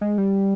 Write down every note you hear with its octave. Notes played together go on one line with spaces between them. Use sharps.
G#3
G3